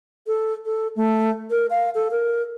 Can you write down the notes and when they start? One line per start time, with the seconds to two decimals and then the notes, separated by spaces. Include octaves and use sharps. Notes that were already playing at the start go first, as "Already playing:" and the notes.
0.27 A4
0.65 A4
0.96 A3
1.50 A#4
1.70 F5
1.95 A4
2.11 A#4